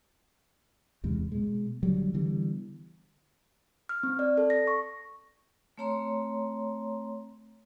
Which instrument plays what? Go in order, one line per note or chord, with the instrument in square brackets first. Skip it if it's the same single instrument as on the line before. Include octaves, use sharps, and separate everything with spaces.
[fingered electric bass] E2 G#2 C3
B2 G#3
D3 F#3 G3
D3 E3 G3 B3
[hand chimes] F6
C4
D5
A4
A#6
C#6
[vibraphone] A3 C4 C#5 A#5 C6